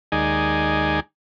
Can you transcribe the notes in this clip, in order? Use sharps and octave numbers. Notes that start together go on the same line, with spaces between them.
D#2 G#3 D#4 D5 G#5